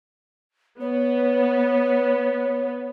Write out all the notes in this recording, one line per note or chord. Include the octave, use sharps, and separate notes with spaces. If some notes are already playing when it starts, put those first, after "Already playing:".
B3 C#5